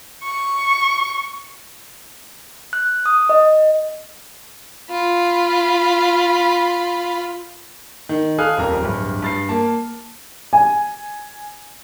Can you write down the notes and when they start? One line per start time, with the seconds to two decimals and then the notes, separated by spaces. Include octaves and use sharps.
0.23 C#6
2.73 F#6
3.06 D#6
3.29 D#5
4.91 F4 B5
8.09 D#3
8.38 A4 F5 G#5 D#6 F6 F#6
8.57 D#1 F2 A#4 A#5
8.81 D1 G2
9.22 G2 A6 C7
9.49 A#3 A5
10.53 G#5